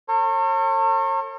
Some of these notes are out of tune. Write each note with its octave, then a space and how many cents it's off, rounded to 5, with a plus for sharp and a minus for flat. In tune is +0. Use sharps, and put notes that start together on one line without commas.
A4 +45 C#5 -35